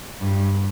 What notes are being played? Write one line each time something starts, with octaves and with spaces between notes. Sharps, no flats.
G2